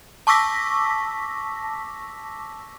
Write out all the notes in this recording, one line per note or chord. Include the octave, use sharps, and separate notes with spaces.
A5 C#6 D6 E6 A#6 B6